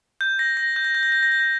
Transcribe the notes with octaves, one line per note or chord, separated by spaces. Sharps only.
G6
A#6
A#6
G6
A#6
G6
A#6
G6
A#6
G6
A#6